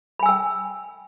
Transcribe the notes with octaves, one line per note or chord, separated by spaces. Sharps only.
G5 G#5 B5 E6